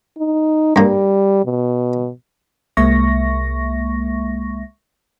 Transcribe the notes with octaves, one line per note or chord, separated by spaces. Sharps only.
D#4
G2 G3 A#3
B2
C2 G#3 A#3 E5 C#6 A#6